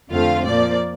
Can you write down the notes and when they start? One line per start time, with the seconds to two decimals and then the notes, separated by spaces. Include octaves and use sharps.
0.11 F2 D3 A3 C4 F4 F5
0.45 A#2 F3 A#3 D5